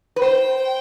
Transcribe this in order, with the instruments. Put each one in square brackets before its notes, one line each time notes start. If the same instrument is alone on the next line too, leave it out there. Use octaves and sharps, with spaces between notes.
[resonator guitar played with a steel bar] B4
[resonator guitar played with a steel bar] C5 [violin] G5